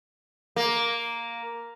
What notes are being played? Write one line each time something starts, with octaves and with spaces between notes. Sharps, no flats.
A#3